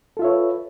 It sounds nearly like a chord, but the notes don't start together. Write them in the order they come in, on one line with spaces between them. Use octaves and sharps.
A4 F4 E5 C#5 B4